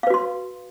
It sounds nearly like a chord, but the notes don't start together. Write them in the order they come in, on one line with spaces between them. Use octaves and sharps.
F5 B4 F#4 C6